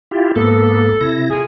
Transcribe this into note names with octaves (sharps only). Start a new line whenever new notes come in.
E4 F4 G4
G#2 A#3 B3 A4
C3 E4 A#6
A3 F4 G#4